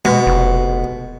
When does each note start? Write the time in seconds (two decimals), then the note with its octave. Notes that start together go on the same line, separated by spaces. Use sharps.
0.05 B2 G#3
0.27 F1